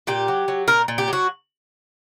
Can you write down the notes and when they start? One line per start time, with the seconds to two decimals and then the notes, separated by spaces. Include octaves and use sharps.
0.07 A#2 G4
0.28 F#3
0.48 F#3
0.68 A#2 A#4
0.88 A#2
0.98 G4
1.08 F#3 F#4